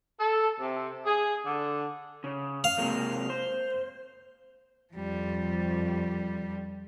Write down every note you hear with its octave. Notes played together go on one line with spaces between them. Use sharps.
A4
C3
G#4
D3
C#3
F5
C3 G#3 A#3
C5
F2 F3 G3